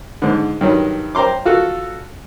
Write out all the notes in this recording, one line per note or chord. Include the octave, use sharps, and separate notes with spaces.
G#2 D3
G2 D#3 F#3
C5 G5 A#5 C6 D6
F4 F#4 A4